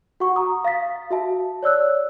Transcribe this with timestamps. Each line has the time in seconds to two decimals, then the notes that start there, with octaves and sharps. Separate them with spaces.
0.20 F#4 F#5 C#6
0.36 A#5 D#6
0.65 F5 D#6 A6 B6
1.11 F#4 E5 A5
1.63 C#5 D5 E6 F#6